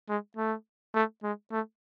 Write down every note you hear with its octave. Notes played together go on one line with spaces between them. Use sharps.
G#3
A3
A3
G#3
A3